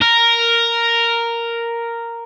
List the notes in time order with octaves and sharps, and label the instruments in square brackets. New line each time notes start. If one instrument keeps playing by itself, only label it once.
[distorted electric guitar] A#4